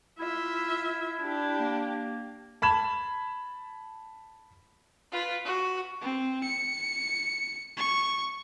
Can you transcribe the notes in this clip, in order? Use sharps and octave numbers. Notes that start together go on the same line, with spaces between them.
E4 F4 E5
D4 G4
A#3
A5 B5 G#6 E7
F4 B4
F#4
C4
C#7
C#6